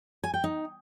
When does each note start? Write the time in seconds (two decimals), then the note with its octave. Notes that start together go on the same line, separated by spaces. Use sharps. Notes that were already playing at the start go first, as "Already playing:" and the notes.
0.24 G#5
0.34 G5
0.44 D#4